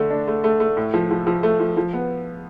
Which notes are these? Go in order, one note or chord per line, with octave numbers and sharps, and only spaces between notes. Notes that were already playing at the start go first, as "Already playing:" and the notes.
Already playing: D3 A3
D4
A3
A3
A3
A2
F3
F3
F3
A3
F3
F3
B3